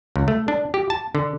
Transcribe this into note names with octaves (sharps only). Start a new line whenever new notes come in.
C#2
A3
D4
G4
A5
D3